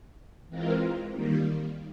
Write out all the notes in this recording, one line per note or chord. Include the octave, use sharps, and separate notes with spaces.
E3 G#3 C4 F4 A#4
D#3 G3 A#3